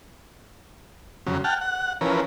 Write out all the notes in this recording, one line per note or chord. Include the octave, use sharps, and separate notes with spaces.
F2 C#3 F#3
F#5 G5 A5 F6
F#5
E3 F3 C#4 A#4 B4